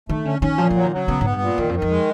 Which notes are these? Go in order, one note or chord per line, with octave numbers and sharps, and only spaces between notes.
D#3 A3
D3 C#4
D#3 C#4
A#2 F3
F3 F#3
D#3
C#3 F#3
C#3 B3
G#2 B3
G2
A#2
E2 D#3
F2
D#3
F2
G#3